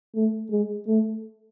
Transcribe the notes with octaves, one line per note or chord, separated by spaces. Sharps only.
A3
G#3
A3